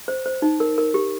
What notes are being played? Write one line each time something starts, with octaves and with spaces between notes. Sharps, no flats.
C5
C5
D#4
A#4
A#4
G4